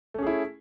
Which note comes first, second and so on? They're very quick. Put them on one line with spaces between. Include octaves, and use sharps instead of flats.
A3 C#4 G#4 E4